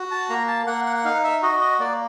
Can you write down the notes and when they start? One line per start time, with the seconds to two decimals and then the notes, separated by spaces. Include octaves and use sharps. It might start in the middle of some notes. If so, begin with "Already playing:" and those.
Already playing: F#4
0.11 A5
0.30 A#3 A#5
0.48 A5
0.67 A#3 F#5
0.86 F#5
0.96 F#5
1.05 D#4 F5
1.24 E5
1.42 F#4 D#5
1.61 D#5
1.79 A#3 D5